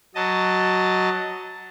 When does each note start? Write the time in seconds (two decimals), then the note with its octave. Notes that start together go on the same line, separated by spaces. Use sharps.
0.15 F#3 D#5 A5